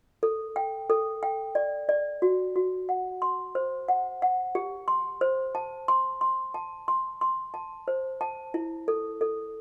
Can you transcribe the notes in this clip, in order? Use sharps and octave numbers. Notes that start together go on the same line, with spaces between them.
A4
G5
A4
G5
D5
D5
F#4
F#4
F#5
C6
C5
F#5
F#5
G4
C6
C5
A5
C6
C6
A5
C6
C6
A5
C5
A5
E4
A4
A4